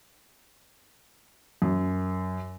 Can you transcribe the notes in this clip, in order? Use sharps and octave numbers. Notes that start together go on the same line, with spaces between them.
F#2